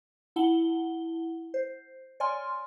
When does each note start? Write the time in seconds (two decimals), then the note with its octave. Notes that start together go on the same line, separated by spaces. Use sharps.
0.36 E4 F#5 A5 G7
1.54 C5
2.20 C#5 D5 G#5 C6 F6